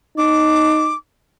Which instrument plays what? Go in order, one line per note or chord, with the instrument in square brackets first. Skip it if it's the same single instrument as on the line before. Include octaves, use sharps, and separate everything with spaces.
[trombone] D#4 [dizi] D6